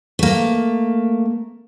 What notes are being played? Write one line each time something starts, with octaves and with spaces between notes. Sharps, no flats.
A3 A#3